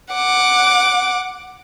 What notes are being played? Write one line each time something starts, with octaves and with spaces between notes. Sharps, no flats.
F#5 D6